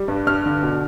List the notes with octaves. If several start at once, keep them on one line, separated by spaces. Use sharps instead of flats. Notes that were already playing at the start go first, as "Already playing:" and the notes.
Already playing: G3
G2
G2 F6
D3
B2